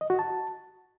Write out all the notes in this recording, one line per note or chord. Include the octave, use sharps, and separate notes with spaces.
D#5
F#4
A5